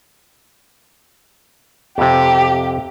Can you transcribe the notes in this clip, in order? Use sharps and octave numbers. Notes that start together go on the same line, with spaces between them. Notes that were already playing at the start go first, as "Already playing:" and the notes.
F2 C3 G4